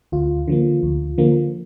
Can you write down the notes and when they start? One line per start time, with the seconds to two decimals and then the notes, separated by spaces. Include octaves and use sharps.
0.12 D2 F4
0.48 D3 F3 A#3
0.83 D2
1.18 D3 F3 A#3